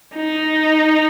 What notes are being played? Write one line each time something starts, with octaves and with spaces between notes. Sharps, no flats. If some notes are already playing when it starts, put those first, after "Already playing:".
D#4